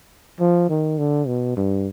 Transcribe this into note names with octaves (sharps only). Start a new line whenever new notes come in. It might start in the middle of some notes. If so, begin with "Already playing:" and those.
F3
D#3
D3
B2
G2